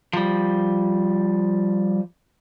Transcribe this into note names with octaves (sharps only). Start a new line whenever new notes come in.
F3 G3